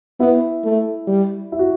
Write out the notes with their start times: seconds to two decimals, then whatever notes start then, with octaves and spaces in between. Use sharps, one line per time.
0.20 B3 E4
0.64 A3
1.08 G3
1.52 E4
1.59 F#4